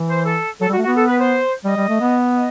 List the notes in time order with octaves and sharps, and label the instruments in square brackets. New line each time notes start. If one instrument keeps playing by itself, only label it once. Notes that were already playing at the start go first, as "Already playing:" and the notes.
Already playing: [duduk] E3
[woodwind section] C5
A4
[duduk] F#3 [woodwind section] A4
[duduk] G3
[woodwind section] F#4
[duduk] A3
[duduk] B3 [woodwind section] F#4
[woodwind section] A4
B4
C5
[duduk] G3 [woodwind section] D#5
[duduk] G3
A3
B3
[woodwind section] D#5